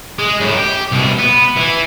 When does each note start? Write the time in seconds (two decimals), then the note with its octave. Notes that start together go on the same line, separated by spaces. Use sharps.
0.19 G#3
0.40 F#2 A2
0.57 G4
0.92 C2 B2
1.19 B3
1.56 E3